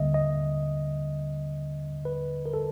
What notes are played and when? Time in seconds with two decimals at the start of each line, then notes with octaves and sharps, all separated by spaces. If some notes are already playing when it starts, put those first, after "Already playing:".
Already playing: D#2 D3 G3 A#3 D#5 E5
0.14 D#5
2.05 B4
2.46 A#4
2.54 A4